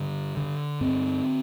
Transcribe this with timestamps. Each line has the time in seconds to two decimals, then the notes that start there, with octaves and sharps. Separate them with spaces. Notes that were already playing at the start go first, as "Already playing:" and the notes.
Already playing: G2 D3
0.37 D3
0.81 G2 C4